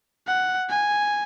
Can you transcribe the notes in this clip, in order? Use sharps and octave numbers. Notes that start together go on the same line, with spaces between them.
F#5
G#5